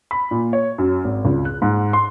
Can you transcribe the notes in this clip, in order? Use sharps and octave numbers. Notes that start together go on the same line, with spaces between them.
B5
A#2
C#5
F#2
G#1
C#2
F#6
G#2
C6